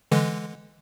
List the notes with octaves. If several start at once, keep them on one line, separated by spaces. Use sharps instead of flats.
D3 E3 G#3